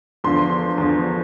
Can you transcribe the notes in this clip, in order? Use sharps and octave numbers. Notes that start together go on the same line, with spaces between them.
E2 D3 F3 C6
E2 D3 F3